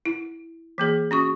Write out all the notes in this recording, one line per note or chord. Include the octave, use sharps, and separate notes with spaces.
E4
E3 A#3 G#4
C#4 F#4 C#6